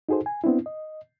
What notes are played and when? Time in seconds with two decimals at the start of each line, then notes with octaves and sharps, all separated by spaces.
0.09 D#4 F#4 G#4 A4 C5
0.26 G#5
0.44 B3 C4 D4 E4
0.66 D#5